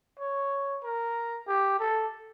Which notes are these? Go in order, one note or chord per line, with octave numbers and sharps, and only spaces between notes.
C#5
A#4
G4
A4